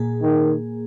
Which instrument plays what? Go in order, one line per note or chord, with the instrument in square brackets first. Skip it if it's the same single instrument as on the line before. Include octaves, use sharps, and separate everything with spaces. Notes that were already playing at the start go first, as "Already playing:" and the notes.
Already playing: [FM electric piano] A#2 A#3 G#4
[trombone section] D#3